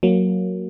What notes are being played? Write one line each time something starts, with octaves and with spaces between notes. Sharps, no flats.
F#3 A#3